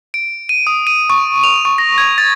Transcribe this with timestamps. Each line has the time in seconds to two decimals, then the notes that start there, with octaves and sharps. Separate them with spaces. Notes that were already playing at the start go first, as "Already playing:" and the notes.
0.14 D7
0.49 D#7
0.67 D#6
0.87 D#7
1.10 C#6
1.44 F7
1.65 C#6
1.78 A#6
1.98 G#6
2.18 A6